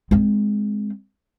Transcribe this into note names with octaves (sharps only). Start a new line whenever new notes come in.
G#3 C4